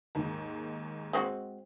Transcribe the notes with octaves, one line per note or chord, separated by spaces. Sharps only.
D#2 G#2
G#3 C4 F#4